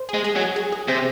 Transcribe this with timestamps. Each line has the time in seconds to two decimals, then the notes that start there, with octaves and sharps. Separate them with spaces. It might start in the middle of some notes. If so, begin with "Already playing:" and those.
Already playing: C5
0.09 G#4
0.14 G#3
0.24 G#4
0.36 F#3
0.41 G#4
0.56 G#4
0.72 G#4
0.88 C3 C5